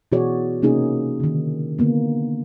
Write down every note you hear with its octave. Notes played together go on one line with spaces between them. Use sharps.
B2 E3 F#4 G#4 C#5 D5
C3 A#3 C#4 D#4 G#4
D3 D#3
D3 A#3 B3